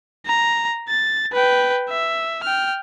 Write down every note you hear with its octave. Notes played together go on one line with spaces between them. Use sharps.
A#5
A6
B4 G5
E5
G5 F6